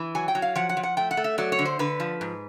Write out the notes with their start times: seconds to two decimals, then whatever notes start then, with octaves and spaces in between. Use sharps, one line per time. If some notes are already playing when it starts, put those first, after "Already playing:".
Already playing: E3
0.15 F#3 G#5
0.28 G5
0.35 F#3
0.42 F5
0.56 F3 F#5
0.69 F#5
0.77 F3
0.83 F#5
0.97 A3 G5
1.11 F#5
1.17 A3
1.24 E5
1.38 F#3 D5
1.52 C#5
1.59 D3
1.65 C5
1.79 D3 B4
2.00 F3
2.21 G#2